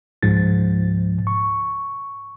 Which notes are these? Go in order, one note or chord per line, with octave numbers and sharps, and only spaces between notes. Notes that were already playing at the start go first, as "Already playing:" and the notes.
C#2 G#2 F3 A6
C#6